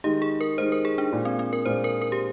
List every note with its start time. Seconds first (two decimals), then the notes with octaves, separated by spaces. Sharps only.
0.04 D#3 G#3 D#4 G4
0.22 G#4
0.41 A#4
0.58 D#3 G#3 D#4 C5
0.72 A#4
0.85 G#4
0.98 D4
1.12 A#2 G#3 D4
1.25 C4
1.39 C4
1.53 A#4
1.66 A#2 G#3 D4 C5
1.84 A#4
2.02 A#4
2.12 G4